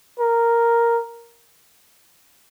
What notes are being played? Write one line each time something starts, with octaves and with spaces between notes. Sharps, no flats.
A#4